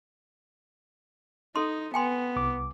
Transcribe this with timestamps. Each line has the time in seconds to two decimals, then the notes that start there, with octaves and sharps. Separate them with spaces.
1.56 D#4 A4 C6
1.94 B3 G5 G#5 C6
2.36 C2 D6